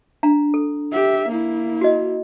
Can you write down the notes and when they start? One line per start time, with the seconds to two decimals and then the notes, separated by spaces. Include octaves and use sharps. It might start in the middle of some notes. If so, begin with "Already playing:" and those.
0.23 D4 F5 A#5
0.54 A4
0.92 G4 E5
1.28 A#3 E4
1.81 F#4 D#5